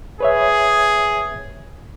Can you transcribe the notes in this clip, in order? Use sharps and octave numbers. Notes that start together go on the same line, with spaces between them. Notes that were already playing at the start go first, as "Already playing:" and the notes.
G#4 B4 C#5 E5